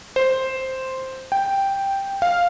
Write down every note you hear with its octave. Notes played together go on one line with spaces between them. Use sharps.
C5
G5
F5